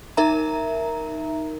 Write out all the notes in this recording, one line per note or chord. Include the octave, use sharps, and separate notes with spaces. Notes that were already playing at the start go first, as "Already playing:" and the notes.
D#4 A#4 E5 A#5